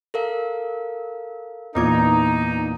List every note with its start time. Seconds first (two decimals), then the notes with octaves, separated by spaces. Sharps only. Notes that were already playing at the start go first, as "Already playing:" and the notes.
0.14 A4 A#4 F5
1.75 E2 A#2 E3 B3 D#4 D6 G#6